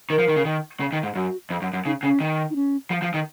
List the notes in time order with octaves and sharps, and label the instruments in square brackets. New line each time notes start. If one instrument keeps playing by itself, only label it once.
[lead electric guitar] D#3 [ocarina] A#4
[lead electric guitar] F3
D#3
C#3
D#3
C#3
D#3
G#2
[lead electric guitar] F#2 [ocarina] F#4
[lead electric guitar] F2
F#2
F#2
[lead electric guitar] C#3 [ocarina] D#4
[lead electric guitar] C#3 [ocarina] C#4
[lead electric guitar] D#3
[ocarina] D#4
C#4
[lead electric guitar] F3
F3
D#3